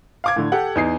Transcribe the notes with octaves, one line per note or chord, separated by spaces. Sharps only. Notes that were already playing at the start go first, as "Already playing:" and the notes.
F5 D6 G#6
A2 D3
G4 A4 F#5
E2 D#4 C7